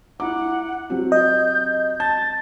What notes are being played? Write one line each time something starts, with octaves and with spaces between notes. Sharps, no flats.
E4 F#5 A#5 D6
F#3 C4 G4
D#5 G6
A5 G6 A6